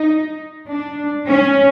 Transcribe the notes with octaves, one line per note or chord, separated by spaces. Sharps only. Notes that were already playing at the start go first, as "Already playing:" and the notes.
Already playing: D#4
D4
C#4